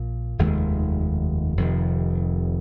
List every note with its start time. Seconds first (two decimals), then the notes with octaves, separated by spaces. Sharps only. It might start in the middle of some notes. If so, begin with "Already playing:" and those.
Already playing: A#1 A#2
0.39 F1 D#2 D#3 G#3
1.57 F1 F2 C3 D#3